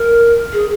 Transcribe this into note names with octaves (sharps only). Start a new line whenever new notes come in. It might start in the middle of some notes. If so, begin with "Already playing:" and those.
Already playing: A#4
G#4